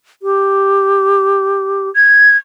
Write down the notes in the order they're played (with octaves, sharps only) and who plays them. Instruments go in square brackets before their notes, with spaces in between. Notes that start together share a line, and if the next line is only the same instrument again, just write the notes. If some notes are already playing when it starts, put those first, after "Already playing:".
[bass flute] G4
[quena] G#6